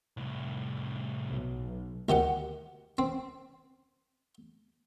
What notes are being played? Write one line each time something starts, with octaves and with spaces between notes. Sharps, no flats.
C2 A2
B1
D2 D#3 G4 F#5
C4